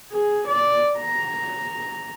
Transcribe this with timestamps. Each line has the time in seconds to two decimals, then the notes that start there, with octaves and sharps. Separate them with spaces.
0.12 G#4
0.47 D5
0.98 A#5